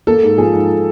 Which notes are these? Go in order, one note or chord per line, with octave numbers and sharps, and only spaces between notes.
A#3 A4
G#2
F3 G#4
G#2